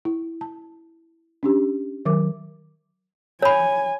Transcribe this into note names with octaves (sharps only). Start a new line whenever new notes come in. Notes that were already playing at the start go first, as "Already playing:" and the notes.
E4
A5
C#4 D4 G4
D#3 F#3 A#4 D6
C#5 G#5 B5